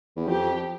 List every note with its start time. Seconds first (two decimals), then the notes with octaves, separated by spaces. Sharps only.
0.16 E2
0.28 F2 G4